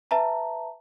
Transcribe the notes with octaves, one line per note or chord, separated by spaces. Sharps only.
B4 E5 A5 A#5